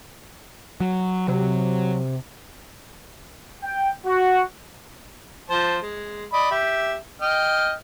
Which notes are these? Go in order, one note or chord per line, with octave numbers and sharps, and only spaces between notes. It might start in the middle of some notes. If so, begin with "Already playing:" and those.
F#3
C3 F#3
G5
F#4
F3 C5 A5
G#3
D5 D#5 B5
G4 E5
D#5 G5 F6